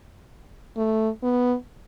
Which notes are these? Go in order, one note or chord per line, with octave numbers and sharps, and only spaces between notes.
A3
B3